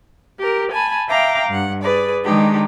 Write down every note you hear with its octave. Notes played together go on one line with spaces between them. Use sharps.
G4 A#4
G#5 A5 B5
E5 F5 G5 A#5 D6
G2 F#5
G#4 B4 D5
D#3 G#3 D4 D#4 G4